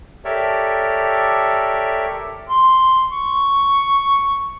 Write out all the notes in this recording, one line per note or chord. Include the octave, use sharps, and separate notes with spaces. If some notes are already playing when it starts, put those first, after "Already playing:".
G4 A4 A#4 C#5 D5 E5
C6
C#6